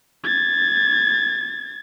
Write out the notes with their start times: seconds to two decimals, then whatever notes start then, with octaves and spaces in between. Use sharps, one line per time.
0.24 G#6 A6